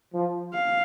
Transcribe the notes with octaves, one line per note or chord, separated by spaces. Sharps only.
F3
F5